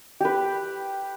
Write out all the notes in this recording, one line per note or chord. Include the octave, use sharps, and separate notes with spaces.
G4 B4